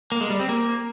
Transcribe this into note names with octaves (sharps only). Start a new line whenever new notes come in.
A#3
G#3
G3
C4
A#3